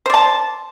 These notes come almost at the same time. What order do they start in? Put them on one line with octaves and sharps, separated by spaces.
C5 D5 A5